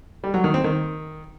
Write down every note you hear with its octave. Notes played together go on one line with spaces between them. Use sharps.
G3
F#3
D#3
C4
D#3